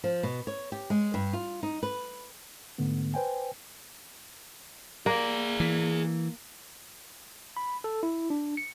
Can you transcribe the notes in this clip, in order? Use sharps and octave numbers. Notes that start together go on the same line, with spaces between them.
F3
B2
C#5
G4
G#3
G2
F4
D#4
B4
G#2 D3 A3 B3
B4 C5 G5 G#5
A#3 G#4 D5
E3
B5
A4
E4
D4
C#7